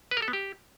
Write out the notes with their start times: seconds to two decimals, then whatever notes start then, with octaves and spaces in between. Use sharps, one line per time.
0.11 B4
0.17 A#4
0.22 A4
0.28 B3
0.33 G4